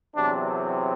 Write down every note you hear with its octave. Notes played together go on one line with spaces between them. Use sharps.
E2 C3 F#3 C4 D4